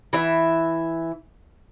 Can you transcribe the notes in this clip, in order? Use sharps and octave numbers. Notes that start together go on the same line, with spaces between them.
E3 E5